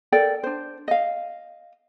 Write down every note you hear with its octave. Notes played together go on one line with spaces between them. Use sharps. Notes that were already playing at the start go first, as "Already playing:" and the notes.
A4 A#4 D5 G5
D4 C5
D#5 F5